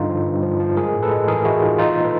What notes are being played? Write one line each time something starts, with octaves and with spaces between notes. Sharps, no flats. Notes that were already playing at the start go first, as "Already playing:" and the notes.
Already playing: G2 D3 D#4 F4
F3
G2
F3
F3
G#3 G#4 A#4
A2
A4 B4
G#3
E3 G#4 A#4
G#3 E4 F#4
E3 D#4 F4
F3 D#4 F4
A#2
A4 B4